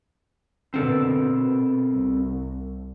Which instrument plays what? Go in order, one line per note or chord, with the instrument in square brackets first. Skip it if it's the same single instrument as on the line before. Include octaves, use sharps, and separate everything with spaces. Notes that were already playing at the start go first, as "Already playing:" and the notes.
[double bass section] B2 D3 B3 [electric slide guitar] C4 A4 A#4
[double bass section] B2
C2